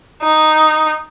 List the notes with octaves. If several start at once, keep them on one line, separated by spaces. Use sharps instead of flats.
D#4